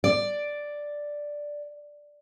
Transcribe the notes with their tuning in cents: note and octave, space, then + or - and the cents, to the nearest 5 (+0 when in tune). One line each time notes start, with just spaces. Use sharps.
D5 +0